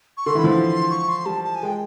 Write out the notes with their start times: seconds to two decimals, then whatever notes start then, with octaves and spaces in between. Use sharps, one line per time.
0.17 C#6
0.26 D3 C6
0.35 E3
0.38 B5
0.44 F3 C6
0.90 C#6
1.09 C6
1.26 G3 A5
1.44 A5
1.55 G#5
1.63 G#3 G5